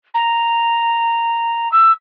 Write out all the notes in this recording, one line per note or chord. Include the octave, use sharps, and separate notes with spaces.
A#5
E6